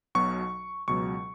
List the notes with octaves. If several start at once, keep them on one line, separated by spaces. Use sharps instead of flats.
B1 B2 F#3 C#6
C#2 B2 F#3 C#6